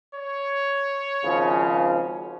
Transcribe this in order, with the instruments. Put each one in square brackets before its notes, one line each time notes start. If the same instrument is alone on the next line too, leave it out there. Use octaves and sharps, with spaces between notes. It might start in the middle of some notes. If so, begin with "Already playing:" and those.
[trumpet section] C#5
[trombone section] G#1 C#3 F3